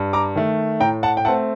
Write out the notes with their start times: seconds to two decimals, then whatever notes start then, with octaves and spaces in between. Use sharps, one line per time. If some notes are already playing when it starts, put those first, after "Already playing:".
Already playing: G2
0.13 A#5 D6
0.36 D#3 A3
0.80 A2 G5 A#5
1.03 F#5 A5
1.17 G5
1.25 A3 C4 F#5 A5